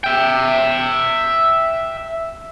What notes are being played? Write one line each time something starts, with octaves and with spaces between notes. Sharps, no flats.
E5 G5